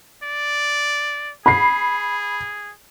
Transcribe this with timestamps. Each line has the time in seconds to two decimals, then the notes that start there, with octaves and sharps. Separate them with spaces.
0.24 D5
1.46 G#4 B5 C7